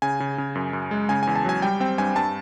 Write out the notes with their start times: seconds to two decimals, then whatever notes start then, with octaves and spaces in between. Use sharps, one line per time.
0.02 C#3 G#5
0.20 C#3
0.38 C#3
0.55 F#2
0.73 F#2
0.91 G#3
1.09 C#3 G#5
1.23 G#5
1.27 E2
1.36 A5
1.45 F#3 G#5
1.62 G3 G5
1.80 C4 G5
1.98 G2 G#5
2.16 G2 A5